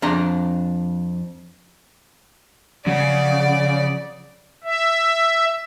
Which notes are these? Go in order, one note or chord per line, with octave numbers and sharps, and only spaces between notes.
F2 D4 A#5
C#3 F3 F#3 C4 D5 F#5
E5